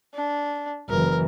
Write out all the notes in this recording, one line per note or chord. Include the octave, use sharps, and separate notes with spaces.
D4
F#1 E3 A#4